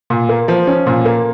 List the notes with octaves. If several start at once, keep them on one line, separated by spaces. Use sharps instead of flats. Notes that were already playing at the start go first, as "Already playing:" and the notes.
A#2
A#3
F3
C#4
A#2
A#3